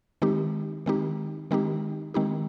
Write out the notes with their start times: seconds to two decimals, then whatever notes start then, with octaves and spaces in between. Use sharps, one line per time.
0.22 D#3 G#3 C4 D#4 G4
0.86 D#3 G#3 C4 D#4 G4
1.51 D#3 G#3 C4 D#4 G4
2.14 D#3 G#3 C4 D#4 G4